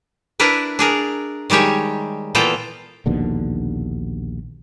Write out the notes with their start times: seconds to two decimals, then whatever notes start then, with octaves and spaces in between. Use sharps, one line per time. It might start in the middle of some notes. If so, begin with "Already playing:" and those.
0.40 D4 E4 A#4 B4
0.79 D4 G#4 A#4
1.50 D#3 G3 G#3 G4 C#5
2.35 A#2 E3 B3 F4 A4 G5
3.06 A#1 D#2 B2 D3